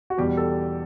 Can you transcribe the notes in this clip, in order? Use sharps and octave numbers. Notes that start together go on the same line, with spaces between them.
F#4
E2 B2 G3 G4
A4